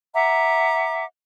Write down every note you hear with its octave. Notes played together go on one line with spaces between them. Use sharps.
E5 F#5 A#5 D6